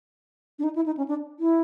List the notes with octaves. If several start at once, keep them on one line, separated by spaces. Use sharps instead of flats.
D4
D#4
E4
D#4
C#4
D4
E4